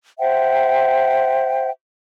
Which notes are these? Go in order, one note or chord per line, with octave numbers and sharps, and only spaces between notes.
C5 E5 F#5 G5